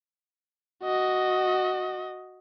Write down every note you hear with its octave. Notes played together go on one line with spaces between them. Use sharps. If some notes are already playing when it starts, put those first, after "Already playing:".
F#4 D#5